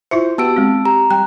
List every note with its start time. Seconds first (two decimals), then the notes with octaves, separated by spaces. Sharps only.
0.11 E4 F4 C5 E5
0.38 B3 F#4 G4 A5 E6 D7
0.56 G#3 C4
0.85 G4 A#5
1.11 G3 G5 F#6